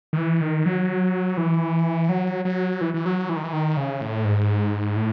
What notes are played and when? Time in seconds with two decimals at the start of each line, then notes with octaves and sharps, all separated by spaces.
0.13 D#3
0.17 E3
0.41 D#3
0.66 F#3
1.37 E3
2.09 F#3
2.45 F#3
2.81 E3
2.94 E3
3.06 F#3
3.29 E3
3.36 D#3
3.44 E3
3.53 D#3
3.77 C#3
4.01 A2
4.25 G#2
4.96 A2